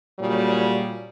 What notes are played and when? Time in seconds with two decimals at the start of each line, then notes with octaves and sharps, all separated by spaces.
0.20 A#2 C#3 F#3 G3